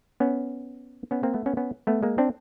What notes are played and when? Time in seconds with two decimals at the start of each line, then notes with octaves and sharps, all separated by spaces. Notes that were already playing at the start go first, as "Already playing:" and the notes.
0.20 B3 C#4
1.11 B3 C#4
1.23 A#3 C4
1.34 A3 B3
1.46 B3 C#4
1.57 B3 C#4
1.87 A3 B3
2.03 G#3 A#3
2.18 C4 D4